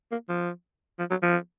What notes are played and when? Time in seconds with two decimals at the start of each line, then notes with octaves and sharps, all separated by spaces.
0.11 A#3
0.29 F3
0.99 F3
1.10 F#3
1.22 F3